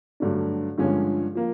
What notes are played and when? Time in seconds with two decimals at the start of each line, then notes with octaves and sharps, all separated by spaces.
0.20 G2 D3 F#3 A3 D4
0.78 G2 D3 F3 G#3 C#4
1.35 F3 A#3